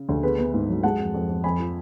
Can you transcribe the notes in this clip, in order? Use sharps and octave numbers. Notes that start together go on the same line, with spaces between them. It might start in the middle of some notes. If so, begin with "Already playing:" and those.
Already playing: C#3
D2
B3 G#4 B4
B3
G#2
F#3
G#3 F#5 A5
F2
F2
F2
F2 G#5 B5
F3